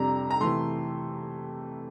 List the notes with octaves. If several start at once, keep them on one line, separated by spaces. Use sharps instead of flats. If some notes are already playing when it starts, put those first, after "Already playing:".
Already playing: F2 C3 G3 D4 A#5
A#5
C3 E3 A3 C6